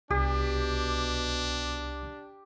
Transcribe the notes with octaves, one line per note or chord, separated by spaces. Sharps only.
C2 B2 D4 G4